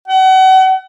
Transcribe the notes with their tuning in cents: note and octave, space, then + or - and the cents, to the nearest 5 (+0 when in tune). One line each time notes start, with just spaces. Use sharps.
F#5 +35